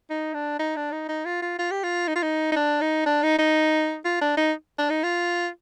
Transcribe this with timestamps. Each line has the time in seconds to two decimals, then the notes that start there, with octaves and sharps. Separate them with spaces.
0.10 D#4
0.34 D4
0.59 D#4
0.76 D4
0.92 D#4
1.09 D#4
1.25 F4
1.42 F4
1.58 F4
1.71 G4
1.83 F4
2.07 D#4
2.15 F4
2.23 D#4
2.52 D#4
2.56 D4
2.81 D#4
3.06 D4
3.23 D#4
3.39 D#4
4.05 F4
4.21 D4
4.37 D#4
4.78 D4
4.90 D#4
5.03 F4